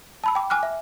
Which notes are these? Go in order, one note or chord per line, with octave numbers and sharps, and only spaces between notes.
A5 B5 E6
G5 D6
G#5 D6 F6 F#6
E5